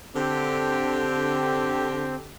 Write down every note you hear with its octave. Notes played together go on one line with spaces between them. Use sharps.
D3 C4 G4